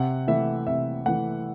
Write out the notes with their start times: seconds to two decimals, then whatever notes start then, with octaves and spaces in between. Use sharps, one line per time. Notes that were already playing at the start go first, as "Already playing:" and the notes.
Already playing: C3 F#5
0.27 E3 A3 E5
0.67 C3 E5
1.06 E3 A3 F#5